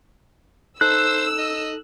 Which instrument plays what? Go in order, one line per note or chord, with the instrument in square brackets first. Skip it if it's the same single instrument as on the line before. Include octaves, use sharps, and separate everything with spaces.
[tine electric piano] D#4 A4 [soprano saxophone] C5 [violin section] E6 [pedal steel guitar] F#6
[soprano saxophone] D#5